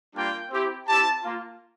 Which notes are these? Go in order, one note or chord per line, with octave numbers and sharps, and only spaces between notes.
G3 A#3 D4 F4 G5
C4 E4 G4
C4 E4 G4 A5
A#3 F4